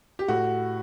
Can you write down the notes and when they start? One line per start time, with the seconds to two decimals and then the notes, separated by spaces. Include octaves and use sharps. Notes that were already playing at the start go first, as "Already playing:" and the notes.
0.19 G4
0.28 A2 F#4